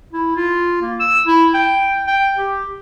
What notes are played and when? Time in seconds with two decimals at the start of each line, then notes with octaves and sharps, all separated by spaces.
0.12 E4
0.36 F4
0.82 A#3
1.00 E6
1.26 E4
1.54 G5
2.07 G5
2.36 G4